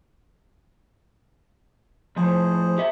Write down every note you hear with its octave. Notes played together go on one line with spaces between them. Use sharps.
A2 F3 G#4 C5
G4 E5